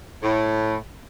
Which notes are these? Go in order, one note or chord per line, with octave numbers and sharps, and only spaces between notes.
A2